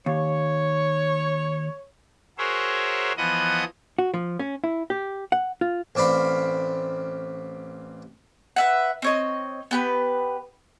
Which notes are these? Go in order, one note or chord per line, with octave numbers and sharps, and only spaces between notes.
D#2 C#5
F#4 G#4 A#4 C5 C#5 E5
E3 F3 B3 D#5 F#5 D#6
F#4
F3
C#4
E4
G4
F#5
F4
A1 C4 D5 F5 B5
B4 E5 F#5
C4 C#5 D#5
B3 G4 B4